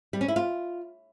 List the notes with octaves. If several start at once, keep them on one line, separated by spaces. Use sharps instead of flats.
G3
C#4
E4
F4